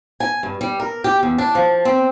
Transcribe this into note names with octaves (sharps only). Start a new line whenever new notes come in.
G#5
G2
G3
A#4
G4
E2
D4
F3
C4